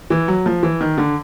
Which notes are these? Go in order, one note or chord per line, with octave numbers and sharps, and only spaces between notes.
E3
F#3
F3
E3
D#3
D3